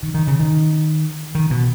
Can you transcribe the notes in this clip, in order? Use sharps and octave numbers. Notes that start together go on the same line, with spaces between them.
D#3
D#3
C#3
D#3
D#3
B2